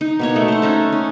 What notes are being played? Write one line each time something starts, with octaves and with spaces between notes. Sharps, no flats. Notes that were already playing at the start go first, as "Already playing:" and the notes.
D#4
B2 A#3 C#5
A3
C5 F#5
C#4 D#4 A4
C#4